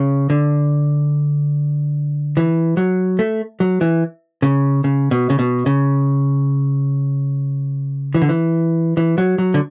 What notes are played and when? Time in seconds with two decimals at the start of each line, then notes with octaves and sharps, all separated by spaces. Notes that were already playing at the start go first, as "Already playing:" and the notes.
Already playing: C#3
0.30 D3
2.37 E3
2.77 F#3
3.19 A3
3.60 F#3
3.81 E3
4.42 C#3
4.84 C#3
5.11 B2
5.30 C#3
5.39 B2
5.66 C#3
8.14 E3
8.22 D3
8.29 E3
8.97 E3
9.18 F#3
9.38 F#3
9.54 D3